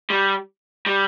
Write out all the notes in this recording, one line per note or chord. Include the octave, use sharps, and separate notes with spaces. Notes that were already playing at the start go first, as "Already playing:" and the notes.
G3
G3